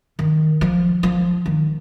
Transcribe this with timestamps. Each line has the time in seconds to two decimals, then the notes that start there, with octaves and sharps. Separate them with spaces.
0.19 D#3
0.61 F3
1.03 F3
1.46 D#3